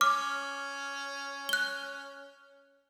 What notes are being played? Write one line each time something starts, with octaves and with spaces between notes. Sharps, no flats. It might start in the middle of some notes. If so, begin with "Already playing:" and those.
C#4 D6 F6
F#6 G7